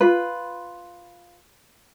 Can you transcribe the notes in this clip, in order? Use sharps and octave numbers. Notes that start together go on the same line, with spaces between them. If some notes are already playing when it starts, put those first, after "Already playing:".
F4 B4